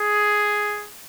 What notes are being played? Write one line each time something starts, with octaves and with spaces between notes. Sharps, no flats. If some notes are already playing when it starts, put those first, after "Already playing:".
Already playing: G#4